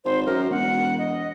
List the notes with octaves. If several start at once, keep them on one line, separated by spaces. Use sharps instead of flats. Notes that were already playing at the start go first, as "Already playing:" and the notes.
G#1 C5
F#2 A#4
E1 F#5
D#5